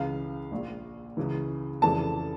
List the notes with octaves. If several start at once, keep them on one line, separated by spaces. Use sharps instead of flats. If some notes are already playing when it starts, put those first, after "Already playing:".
Already playing: C#2 C#3 E3 F5
A#1 A#2
C#2 C#3 E3
F1 F2 C#3 E3 A5